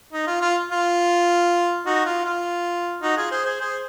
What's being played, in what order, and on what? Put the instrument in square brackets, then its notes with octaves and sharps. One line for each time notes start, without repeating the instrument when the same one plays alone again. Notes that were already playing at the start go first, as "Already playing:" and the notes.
[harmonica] D#4
F4
F4
F4
D#4 F#4
F4
F4
D#4 F#4
F4 G#4
G#4 C5
G#4 C5
G#4 C5